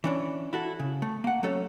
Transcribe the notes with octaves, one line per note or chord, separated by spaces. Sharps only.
E3 C#4 D4
E4 F#4 A4
C#3
A3
A#3 F#5
F#3 A3 C#4 A4 C#5